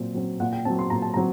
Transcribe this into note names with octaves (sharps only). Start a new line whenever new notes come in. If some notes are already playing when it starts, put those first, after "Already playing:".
Already playing: A#2 F#3 C4
F#3 C4
A#2 F#5
G5
F#3 C4 A5
C6
A#2 A#5
A5
F#3 C4 A#5